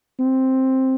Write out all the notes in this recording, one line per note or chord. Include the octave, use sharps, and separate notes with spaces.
C4